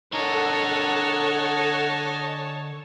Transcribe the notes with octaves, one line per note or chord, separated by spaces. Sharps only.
D3 A4 A#4 C#5 D#5 F#5 G#5 A5